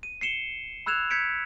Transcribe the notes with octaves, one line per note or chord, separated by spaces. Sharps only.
D#7
C7 C#7 E7 G7
B5 E6 F#6 G#6 E7 F7
G6 G#6 B6 C#7 D7